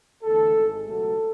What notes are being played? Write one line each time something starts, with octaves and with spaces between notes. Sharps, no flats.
E2 D3 A3 A4
G#1 G#2 G#3
C#2 B2 F#3 A3 A4